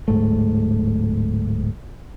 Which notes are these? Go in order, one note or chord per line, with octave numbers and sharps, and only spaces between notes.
D1 G#2 A3